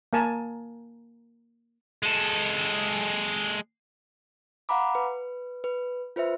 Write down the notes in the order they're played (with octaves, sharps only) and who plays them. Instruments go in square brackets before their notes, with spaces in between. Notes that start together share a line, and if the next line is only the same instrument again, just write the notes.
[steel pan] A#3 A#4 G#5 A5
[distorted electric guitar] G#3 A4
[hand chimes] F5 F#5 A#5 B5 D6
B4
B4
F4 B4 C5 E5